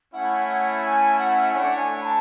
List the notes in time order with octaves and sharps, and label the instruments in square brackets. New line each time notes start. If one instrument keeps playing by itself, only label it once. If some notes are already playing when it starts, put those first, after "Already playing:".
[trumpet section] A3 C#4 E4 [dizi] F#5
[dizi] F#5
G#5
F#5
[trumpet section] A3 D4 A4 C#5 [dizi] F#5 G#5
[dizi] G#5
B5
A5